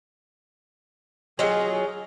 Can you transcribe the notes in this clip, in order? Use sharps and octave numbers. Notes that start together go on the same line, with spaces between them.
F#3 F4 G#4 D#5